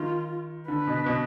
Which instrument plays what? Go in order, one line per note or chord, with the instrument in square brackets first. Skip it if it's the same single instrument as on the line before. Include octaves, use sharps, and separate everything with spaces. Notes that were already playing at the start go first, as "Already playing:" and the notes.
Already playing: [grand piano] D#3 [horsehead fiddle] F4
[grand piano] D3 [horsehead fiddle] B4
[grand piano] B2
B2